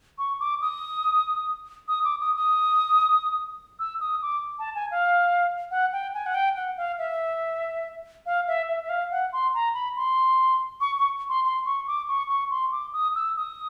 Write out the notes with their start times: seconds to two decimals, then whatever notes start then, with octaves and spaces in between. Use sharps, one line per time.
0.18 C#6
0.40 D6
0.62 D#6
1.88 D#6
2.05 D6
2.21 D#6
2.36 D#6
3.79 E6
4.01 D#6
4.22 D6
4.59 A5
4.75 G#5
4.91 F5
5.71 F#5
5.93 G5
6.14 G#5
6.26 F#5
6.35 G5
6.56 F#5
6.77 F5
6.98 E5
8.26 F5
8.47 E5
8.69 E5
8.84 E5
8.89 F5
9.11 F#5
9.33 C6
9.54 A#5
9.74 B5
9.96 C6
10.81 C#6
10.98 C#6
11.29 C6
11.45 C6
11.66 C#6
11.88 D6
12.08 C#6
12.29 C#6
12.51 C6
12.72 D6
12.93 D#6
13.15 E6
13.37 D#6